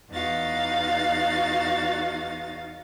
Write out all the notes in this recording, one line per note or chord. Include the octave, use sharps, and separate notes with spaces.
E2 D#4 F#4 F5 A6